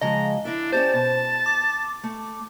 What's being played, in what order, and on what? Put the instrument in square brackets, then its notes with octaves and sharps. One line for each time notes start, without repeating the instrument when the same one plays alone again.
[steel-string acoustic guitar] C#3 F3 G#3 [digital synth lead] D#5 [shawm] A#5
[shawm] D4 [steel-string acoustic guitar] E4 A#4 E5
[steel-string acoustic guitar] C#4 G4 D5 [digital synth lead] C5 [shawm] A5
[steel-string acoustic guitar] B2 [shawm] A5
[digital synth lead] D6
[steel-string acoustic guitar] A3